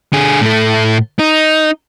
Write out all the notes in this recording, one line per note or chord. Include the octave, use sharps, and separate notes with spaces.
D3 G#4
A2 A3
D#4